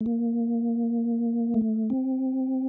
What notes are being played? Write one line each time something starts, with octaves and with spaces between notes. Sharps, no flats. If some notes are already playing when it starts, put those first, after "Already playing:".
A3
A#3
A3
C4